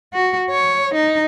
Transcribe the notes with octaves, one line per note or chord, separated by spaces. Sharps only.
F#4
C#5
D#4